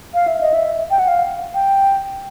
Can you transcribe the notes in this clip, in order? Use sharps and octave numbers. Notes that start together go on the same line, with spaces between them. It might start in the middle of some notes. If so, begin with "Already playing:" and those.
F5
E5
D#5
E5
G5
F#5
F5
G5